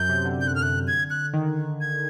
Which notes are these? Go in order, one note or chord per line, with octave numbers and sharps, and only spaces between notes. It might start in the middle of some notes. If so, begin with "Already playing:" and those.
Already playing: F#2 G6
C3
D3
G6
F#6
F6
F#6
G#6
F#6
D#3
G#6